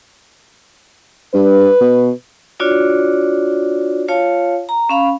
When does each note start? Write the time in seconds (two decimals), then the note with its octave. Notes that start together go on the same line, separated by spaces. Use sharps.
1.34 G2 B4
1.81 B2
2.60 D4 F4 F#4 C#5 D5
4.08 F4 C#5 F5 A5
4.69 A#5
4.89 C#4 F5 B5